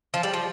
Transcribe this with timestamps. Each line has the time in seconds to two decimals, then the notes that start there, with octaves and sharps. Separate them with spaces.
0.14 F3
0.23 G3
0.34 F3